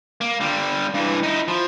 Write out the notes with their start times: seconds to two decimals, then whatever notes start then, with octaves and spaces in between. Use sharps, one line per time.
0.21 A#3
0.41 D3 G3
0.94 G2 E3
1.23 D#4 E4
1.48 F3